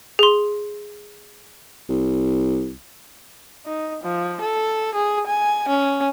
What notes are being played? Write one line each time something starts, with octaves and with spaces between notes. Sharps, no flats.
G#4 C6
C2
D#4
F3
A4
G#4
G#5
C#4